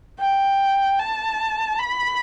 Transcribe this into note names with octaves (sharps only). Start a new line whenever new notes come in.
G5
A5
B5